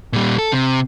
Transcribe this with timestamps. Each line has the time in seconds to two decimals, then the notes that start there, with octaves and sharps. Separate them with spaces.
0.13 A#2 G3
0.38 A4
0.52 C3